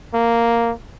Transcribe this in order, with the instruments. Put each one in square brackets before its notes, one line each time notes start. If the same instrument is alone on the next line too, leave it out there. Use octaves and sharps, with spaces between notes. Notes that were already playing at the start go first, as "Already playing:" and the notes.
[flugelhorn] A#3